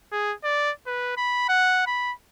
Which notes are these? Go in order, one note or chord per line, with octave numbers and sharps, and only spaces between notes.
G#4
D5
B4
B5
F#5
B5